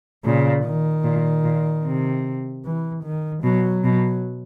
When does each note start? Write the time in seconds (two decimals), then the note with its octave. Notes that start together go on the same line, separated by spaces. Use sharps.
0.25 A#2 C#3
0.65 D#3
1.04 A#2
1.44 A#2
1.84 C3
2.64 E3
3.04 D#3
3.43 B2 F#3
3.84 B2 F#3